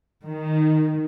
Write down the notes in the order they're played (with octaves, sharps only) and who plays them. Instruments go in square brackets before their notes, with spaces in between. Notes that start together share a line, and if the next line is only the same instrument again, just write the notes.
[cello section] D#3